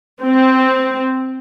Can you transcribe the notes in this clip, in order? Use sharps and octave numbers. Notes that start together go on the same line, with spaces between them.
C4